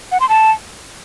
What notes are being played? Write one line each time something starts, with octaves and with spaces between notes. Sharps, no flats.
F#5
C6
A5